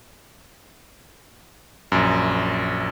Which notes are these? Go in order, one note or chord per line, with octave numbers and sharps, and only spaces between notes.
A#1 F#2